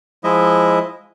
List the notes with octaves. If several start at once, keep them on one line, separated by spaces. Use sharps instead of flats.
F3 G#3 E4 D#5 E5